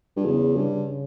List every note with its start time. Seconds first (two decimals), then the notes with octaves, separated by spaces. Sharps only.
0.16 G2
0.25 E2 C#3
0.56 G2
0.71 C#3